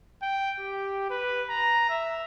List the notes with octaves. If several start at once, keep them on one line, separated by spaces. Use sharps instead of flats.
G5
G4
B4
A#5
E5